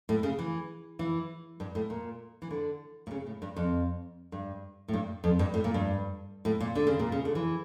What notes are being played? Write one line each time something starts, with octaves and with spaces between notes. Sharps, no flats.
A2
C#3
E3
E3
G2
A2
A#2
E3
D3
A#2
C#3
A2
G2
F2
G2
A2
G2
F2
G2
A2
A#2
G2
A2
A#2
D3
C#3
A#2
C#3
D3
E3